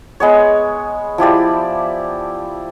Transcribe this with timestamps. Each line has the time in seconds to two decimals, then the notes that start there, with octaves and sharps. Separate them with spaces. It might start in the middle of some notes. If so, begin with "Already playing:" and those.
0.20 G#3 B3 C#5
1.18 F3 E4 G4 D5